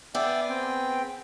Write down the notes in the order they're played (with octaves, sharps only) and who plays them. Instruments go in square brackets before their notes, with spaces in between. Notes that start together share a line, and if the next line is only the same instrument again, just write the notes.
[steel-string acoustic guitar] B3 G#4 [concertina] D5 E5 G5
[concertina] C4 G5